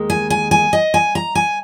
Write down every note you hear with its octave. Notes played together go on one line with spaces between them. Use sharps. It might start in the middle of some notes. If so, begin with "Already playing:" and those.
Already playing: D#2 D#3 G#3
G#5
G#5
G#5
D#5
G#5
A#5
G#5